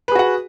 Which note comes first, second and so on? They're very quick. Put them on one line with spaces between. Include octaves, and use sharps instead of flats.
B4 G#4 F#4 F#5